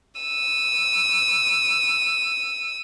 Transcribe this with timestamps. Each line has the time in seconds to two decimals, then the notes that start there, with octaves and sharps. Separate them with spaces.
0.21 E6 D#7